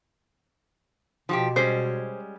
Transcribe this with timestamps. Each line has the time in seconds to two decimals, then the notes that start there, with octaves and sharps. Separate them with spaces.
1.29 B2 F3 F#4 G4
1.56 G3 G#3 C#4 C5